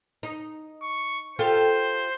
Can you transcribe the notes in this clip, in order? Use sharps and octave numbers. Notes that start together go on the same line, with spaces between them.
D#4
C#6
F4 G4 A4 C5